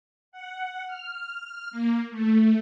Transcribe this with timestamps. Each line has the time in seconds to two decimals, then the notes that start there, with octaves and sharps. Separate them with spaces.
0.32 F#5
0.87 F6
1.71 A#3
2.11 A3